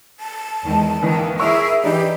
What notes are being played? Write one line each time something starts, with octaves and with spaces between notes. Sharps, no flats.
A5
E2 D#3 G#3
D#3 E3 A#3
E4 G#4 A#4 E5 C#6 E6
E3 D4 D#4 G4